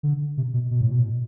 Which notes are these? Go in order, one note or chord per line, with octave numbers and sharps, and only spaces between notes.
D3
C3
B2
B2
A2
B2
A2
B2